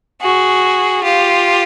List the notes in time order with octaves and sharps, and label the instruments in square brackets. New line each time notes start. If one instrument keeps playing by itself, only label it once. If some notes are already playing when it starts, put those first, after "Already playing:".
[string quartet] F#4 G#4
F4 G4